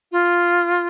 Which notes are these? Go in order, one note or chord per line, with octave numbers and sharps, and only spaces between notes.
F4